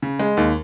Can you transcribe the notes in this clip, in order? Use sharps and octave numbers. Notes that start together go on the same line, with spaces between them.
C#3
G#3
D#2